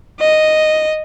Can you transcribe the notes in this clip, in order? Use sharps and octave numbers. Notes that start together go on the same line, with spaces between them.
D#5